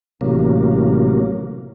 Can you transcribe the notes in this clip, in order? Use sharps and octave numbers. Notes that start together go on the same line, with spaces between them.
A1 C3 F#3 A#3